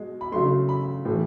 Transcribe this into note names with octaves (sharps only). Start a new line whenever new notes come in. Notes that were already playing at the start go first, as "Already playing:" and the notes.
Already playing: B2 G#3
B5
C#3 F#3 A3 C6
B5
A2 E3 A3